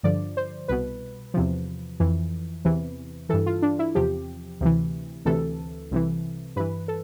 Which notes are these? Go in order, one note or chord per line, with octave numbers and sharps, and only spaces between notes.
G2 D3 F3 D5
C5
C2 B2 B4
E2 C3 F3
F2 E3
E2 C3 E3
G2 E3 A4
F4
D4
E4
E2 C3 F3 G4
D2 C3 E3
D2 C3 E3 A4
C2 C3 E3
G2 E3 B4
A4